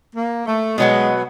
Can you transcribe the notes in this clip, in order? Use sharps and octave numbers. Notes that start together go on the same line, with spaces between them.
A#3
A3
B2 F#3 G#3 B3